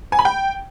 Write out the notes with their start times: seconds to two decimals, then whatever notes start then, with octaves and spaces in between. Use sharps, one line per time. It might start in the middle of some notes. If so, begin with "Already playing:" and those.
0.12 G#5
0.19 B5
0.25 G5